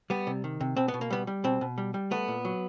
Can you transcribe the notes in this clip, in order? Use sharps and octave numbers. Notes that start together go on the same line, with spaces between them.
G3 B3
C3
D#3
C3
B2 C4
B3
B2
A#3
G3 B3
G3
B2 C4
B2
G3
G3
A3 B3
A#2
F#3